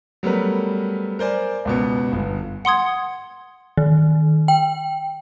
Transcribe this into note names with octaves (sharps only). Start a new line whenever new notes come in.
F#3 G3 A3 B3 A#4 B4
A#4 C5 D5 G#5
C#2 B2 B3
G1
F#5 C6 D#6 G#6
D#3
G5